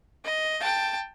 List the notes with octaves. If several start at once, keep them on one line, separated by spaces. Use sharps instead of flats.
D#5
G5 A5